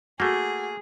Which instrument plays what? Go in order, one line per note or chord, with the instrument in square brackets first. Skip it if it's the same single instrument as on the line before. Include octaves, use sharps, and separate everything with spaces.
[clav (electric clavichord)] A3 A#3 [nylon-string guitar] F#4 [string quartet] G#4